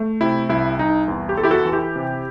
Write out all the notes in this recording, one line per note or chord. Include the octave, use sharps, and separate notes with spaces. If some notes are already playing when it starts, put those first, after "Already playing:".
Already playing: A3
C3 E4
C2 E4
C2 D#4
E2
G4
E2 A4
E4 G4
F#4 A4
E3
E4 G4
C3